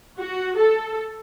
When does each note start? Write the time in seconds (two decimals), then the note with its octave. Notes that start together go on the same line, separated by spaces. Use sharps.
0.18 F#4
0.58 A4